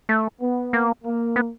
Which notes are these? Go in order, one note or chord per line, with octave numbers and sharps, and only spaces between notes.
A3
B3
A#3
A#3
B3